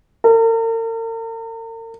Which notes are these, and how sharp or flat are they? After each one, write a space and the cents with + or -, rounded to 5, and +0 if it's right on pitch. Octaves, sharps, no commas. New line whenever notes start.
A#4 -45